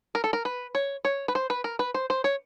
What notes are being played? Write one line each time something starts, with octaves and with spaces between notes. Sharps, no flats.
A#4
A4
A#4
B4
C#5
C#5
B4
C5
B4
A#4
B4
C5
C5
C#5